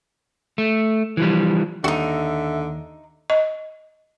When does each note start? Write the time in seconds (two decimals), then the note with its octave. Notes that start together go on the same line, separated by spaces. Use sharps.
0.58 A3
1.17 E3 F3 G3
1.84 D#2 D3 D#4 F#4 E5
3.30 D#5